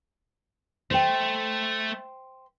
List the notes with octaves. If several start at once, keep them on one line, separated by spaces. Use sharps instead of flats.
A3 C5 G5